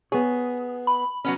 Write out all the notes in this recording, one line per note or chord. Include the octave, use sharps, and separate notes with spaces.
B3 G#4 C#5
B5
F#3 B3 C#4